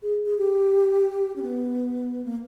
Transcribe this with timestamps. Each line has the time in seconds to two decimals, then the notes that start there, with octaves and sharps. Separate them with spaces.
0.03 G#4
0.26 G#4
0.38 G4
1.36 C#4
1.42 B3
2.25 A#3